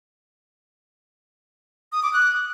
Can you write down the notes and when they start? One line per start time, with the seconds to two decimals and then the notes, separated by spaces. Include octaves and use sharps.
1.92 D#6
2.03 D6
2.13 F#6